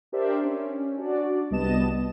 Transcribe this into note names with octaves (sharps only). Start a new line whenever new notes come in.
D4 G4 A#4 C5 D5 E5
C#4
D4 F#4 D5
C2 G3 B3 D#5 A5 E7